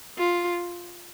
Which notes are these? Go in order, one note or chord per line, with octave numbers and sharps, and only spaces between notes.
F4